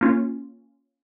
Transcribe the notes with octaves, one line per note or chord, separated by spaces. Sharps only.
A#3 C#4 F4